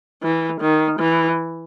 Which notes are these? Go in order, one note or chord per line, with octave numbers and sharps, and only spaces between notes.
E3
D#3
E3